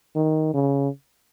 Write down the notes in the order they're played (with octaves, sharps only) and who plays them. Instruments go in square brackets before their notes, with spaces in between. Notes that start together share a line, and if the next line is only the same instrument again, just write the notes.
[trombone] D#3
C#3